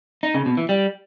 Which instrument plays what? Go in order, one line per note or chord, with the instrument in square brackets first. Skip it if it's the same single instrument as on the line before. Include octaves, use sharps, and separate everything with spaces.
[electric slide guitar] D#4
C#3
B2
E3
G3